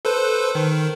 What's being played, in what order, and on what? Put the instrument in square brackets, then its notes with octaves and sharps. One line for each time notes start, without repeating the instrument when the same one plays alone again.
[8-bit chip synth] A4 B4 C5
D#3